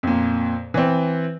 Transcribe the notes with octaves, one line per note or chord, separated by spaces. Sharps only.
F2 A#2
E3 C4